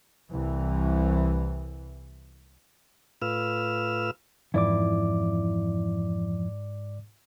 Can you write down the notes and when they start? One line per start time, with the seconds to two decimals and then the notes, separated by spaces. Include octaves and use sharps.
0.30 C2 E3
3.22 A2 F4 B4 E6 F6
4.54 F2 G#2 E3 E4 D5 D6